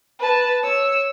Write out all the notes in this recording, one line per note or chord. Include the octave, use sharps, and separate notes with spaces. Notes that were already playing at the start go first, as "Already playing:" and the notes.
B4 A5
C#5 E6